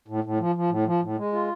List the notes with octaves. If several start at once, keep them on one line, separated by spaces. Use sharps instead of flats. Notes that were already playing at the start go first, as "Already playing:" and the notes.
A2
A2
F3
F3
A2
F3
A2
G#3
F4